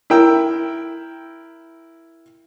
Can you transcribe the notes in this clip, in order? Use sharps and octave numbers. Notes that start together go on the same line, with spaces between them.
E4 A#4 G5 E6